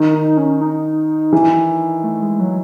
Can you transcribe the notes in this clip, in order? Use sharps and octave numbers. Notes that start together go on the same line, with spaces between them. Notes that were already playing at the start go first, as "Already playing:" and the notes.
Already playing: D#3
D#4
C#4
D#4
E3
A3
G#3
F#3